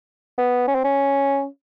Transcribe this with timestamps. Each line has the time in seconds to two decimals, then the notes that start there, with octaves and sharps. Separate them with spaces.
0.38 B3
0.67 C#4
0.75 C4
0.84 C#4